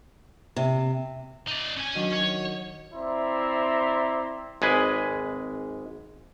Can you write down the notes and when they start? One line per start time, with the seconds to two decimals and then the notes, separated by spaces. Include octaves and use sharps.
0.56 C3
1.47 D#4 D5
1.77 C#4 G#5
1.95 D#3 F#3 D4
2.12 C#5
2.94 C4 E4 D5 E5 A#5 C6
4.62 G#1 G#3 G#4 B4